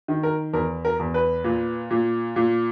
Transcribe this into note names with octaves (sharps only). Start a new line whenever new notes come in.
D#3
A#4
E2 A#4
A#4
E2
B4
A#2
A#2
A#2